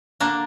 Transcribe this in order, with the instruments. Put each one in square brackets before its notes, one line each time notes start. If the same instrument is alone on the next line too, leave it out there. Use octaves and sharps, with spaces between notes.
[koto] D3 A#3 D4